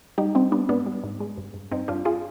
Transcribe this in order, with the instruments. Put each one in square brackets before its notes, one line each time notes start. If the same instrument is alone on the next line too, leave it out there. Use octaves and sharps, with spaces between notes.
[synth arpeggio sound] G3 D#4 G4
G3 C4 D#4
G3 B3 D4
G#2 B3 D4
G3
G#2
G#3
G2
G2
G2 C4 D#4
G2 D4 F4
F4 G#4